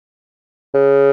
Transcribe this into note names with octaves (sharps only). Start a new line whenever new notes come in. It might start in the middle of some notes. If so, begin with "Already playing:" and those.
C#3